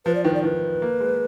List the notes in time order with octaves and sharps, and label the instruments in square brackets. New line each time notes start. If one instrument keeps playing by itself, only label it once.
[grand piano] F3 [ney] B4
[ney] D5
[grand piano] D#3 [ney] B4
[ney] D5
[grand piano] D#3 [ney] B4
[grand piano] A#3
G#3